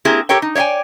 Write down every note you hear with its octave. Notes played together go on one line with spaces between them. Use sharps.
A#3 C4 E4 G4 G#4
G4 A4 A#4 C#5 G5
D#4
C#5 D5 E5 G5 G#5